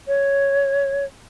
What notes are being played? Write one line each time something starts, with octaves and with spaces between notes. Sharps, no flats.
C#5